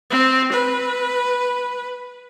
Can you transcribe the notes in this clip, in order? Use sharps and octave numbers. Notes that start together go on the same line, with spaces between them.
C4
B4